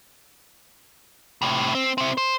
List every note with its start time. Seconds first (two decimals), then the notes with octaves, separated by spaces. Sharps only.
1.42 A2 C3
1.75 C4
1.98 C4 E4
2.18 C5